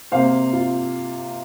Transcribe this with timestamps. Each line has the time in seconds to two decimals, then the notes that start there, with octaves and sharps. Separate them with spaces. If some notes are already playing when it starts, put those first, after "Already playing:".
0.12 C3 A#3 C5 F5
0.53 F4